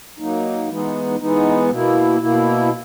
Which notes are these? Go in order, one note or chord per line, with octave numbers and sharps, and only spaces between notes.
F#3 A#3 D#4
E3 G#3 B3 D#4
E3 G#3 B3 D#4
B2 A#3 E4
B2 A#3 E4